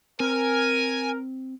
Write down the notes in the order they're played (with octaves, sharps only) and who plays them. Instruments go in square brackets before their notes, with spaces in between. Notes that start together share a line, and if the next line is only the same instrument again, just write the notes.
[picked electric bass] C4 [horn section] A#4 [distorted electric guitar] G#5